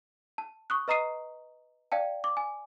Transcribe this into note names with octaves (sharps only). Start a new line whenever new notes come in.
A5
C#6 D#6 F#6
B4 D#5 A#5 D#6 C7 D#7
D5 F5 G5 A5
D6
G#5